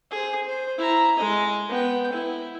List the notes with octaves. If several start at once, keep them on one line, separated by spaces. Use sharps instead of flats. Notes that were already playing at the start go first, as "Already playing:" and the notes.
G#4 C5
C5
E4 A#5
G#3 D#5
B3 G5
E4